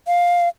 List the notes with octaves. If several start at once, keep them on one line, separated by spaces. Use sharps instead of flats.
F5